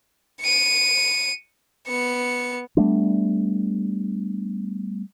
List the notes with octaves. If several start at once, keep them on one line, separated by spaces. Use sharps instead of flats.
C#7 D#7
B3 C#7
G3 A3 B3 D4